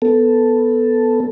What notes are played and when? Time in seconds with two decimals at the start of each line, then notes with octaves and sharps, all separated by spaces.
0.02 B3 A4